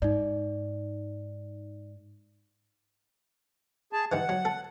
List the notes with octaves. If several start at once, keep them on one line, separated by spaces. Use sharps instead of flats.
G#2 D#4 D5
G#4 A5
G2 D#3 E3 F#5
F#3
A4